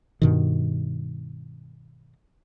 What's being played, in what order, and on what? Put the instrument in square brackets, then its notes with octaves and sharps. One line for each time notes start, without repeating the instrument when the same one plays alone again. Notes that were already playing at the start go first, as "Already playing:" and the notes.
[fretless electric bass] G2 B2 D#3